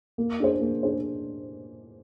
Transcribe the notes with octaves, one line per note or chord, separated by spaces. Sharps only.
A#3
D4 G#4 C5
A#3
D4 G#4 C5